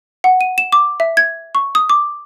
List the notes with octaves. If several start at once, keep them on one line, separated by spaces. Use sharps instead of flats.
F#5
D#7
E7
D6
E5
G#6
C#6
D#6
D6